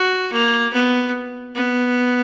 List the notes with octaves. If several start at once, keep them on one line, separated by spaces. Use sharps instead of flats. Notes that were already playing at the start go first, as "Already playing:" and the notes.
Already playing: F#4
A#3
B3
B3